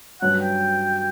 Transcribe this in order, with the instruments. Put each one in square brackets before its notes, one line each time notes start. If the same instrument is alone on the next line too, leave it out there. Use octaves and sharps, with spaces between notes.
[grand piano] G2 F#3 C#4 F#4 B4 [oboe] F#5
[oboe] G5